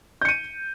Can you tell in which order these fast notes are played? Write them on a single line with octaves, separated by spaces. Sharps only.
G6 C#7 D#7